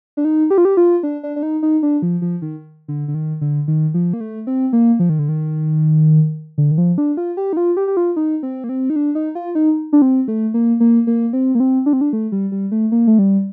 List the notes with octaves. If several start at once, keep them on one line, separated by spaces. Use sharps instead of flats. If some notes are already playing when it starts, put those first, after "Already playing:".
D4
D#4
G4
F4
G4
F4
D4
D4
D4
D#4
D#4
D4
F3
F3
D#3
D3
D3
D#3
D3
D#3
F3
A#3
A3
C4
A#3
F3
D#3
D3
D#3
D3
D#3
F3
D4
F4
G4
D#4
F4
G4
G4
F4
D#4
C4
A#3
C4
D#4
D4
D#4
F4
D#4
D4
C4
A3
A#3
A#3
A#3
C4
A#3
C4
D4
C4
D4
A3
G3
G3
A3
A#3
A3
G3